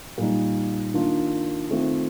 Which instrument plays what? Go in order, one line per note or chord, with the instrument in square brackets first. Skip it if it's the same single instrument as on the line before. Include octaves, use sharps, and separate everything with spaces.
[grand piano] A#2 G3 A#3 D#4
D#3 A#3 D4 F4
D#3 A3 C4 F4